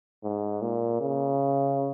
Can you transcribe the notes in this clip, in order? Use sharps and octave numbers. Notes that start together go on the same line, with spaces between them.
G#2
A#2
C#3